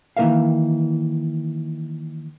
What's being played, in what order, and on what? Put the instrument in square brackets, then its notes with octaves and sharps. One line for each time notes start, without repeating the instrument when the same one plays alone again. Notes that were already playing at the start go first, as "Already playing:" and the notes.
[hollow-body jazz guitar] D#3 E3 A#3 A#4 E5 F5